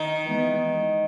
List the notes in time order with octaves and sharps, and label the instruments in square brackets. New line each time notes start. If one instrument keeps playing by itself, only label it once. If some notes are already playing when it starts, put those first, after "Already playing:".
Already playing: [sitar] D#3 D#4
[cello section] E3 G#3 B3